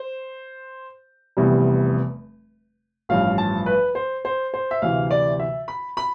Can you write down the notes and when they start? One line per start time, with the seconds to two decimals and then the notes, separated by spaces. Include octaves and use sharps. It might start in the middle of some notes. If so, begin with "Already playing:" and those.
Already playing: C5
1.37 F1 E2 C3 G3
3.09 A1 G2 F3 F5
3.38 A5
3.66 B4
3.95 C5
4.25 C5
4.54 C5
4.71 E5
4.82 D2 C3 E3 F5
5.11 D5
5.40 E5
5.68 B5
5.97 B5